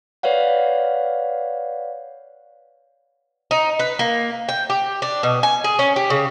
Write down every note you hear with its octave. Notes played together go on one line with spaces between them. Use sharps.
B4 C#5 D5 F5 F#5
D#4
B4
A#3
G5
G4
D4
B2
G#5
G#4
C#4
G4
C#3